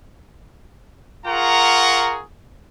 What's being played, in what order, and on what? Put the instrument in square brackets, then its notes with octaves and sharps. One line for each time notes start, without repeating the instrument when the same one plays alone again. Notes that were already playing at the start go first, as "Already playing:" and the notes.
[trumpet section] F4 G#4 A#4 F#5 A#5 C#6